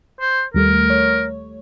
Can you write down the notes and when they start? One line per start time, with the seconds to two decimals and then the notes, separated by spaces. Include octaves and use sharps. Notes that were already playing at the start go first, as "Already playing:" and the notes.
0.20 C5
0.54 D#2 G3 A3 A#4
0.90 C#5